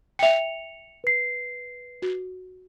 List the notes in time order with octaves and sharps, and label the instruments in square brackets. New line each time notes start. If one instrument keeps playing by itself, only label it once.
[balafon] E5 G5 [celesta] C#7 F7
[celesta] B4 C7
[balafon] F#4